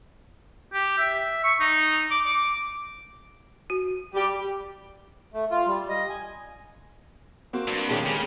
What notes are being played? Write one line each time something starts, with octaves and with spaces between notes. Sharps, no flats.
G4
E5
C#6
D#4
D6
D6
F#4
G3 G4
A3
F4
G3
D#5
G#5
A#3 C4 F#4
G2
D#2 G#3 A#3 G4 C#5 A5
C#3